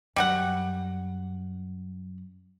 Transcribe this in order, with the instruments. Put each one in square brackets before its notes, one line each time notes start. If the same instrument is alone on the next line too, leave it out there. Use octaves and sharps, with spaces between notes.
[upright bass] F#2 [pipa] G3 F#4 F#5